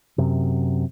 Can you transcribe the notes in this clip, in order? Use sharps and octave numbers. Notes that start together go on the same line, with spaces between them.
F#2 C3